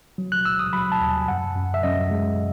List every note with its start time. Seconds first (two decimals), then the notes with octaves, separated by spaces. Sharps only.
0.18 F#3
0.32 F#6
0.45 F#3 E6
0.59 D#6
0.73 F#3 B5
0.92 A5
1.01 D#2
1.11 G#5
1.28 F#2 F#5
1.56 F#2
1.74 E5
1.83 F#2 D#5
2.11 G#3